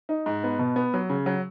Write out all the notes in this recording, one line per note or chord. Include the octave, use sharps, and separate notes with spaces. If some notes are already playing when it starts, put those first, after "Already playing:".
D#4
G#2
B3
B2
B3
F#3
C#3
F#3